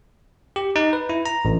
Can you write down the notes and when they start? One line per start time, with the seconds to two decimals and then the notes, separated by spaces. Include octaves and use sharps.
0.56 G4
0.76 D#4
0.93 B4
1.09 E4
1.26 A#5
1.45 A1